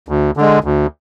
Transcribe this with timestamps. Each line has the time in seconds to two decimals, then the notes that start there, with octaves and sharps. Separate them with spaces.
0.09 D2
0.37 D3 G#3
0.64 D2